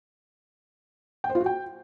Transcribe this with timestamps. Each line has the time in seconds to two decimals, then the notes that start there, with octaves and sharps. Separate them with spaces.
1.24 G5
1.30 C5
1.35 F4
1.41 F#4
1.46 G5